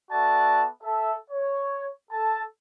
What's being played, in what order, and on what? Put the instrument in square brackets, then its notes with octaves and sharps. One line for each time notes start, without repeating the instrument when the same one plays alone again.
[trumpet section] B3 F#4 A4 D5 E5 A5
A4 E5
C#5
A4 A5